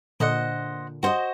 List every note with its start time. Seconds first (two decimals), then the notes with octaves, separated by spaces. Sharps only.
0.20 A#2 D3 C5 D#5 F#5
1.03 G2 F#4 C5 D#5